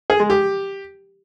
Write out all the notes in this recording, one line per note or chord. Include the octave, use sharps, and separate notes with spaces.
G#4
G#3
G4